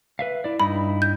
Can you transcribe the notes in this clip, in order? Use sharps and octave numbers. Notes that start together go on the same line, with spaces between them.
B4 E5 F5
E4 D5
G2 D#4 E4 B5
G6